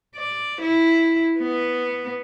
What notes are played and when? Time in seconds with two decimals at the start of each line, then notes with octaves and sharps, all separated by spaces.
0.16 D5
0.61 E4
1.39 B3